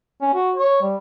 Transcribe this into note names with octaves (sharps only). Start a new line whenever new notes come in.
C#4
F#4
C#5
G3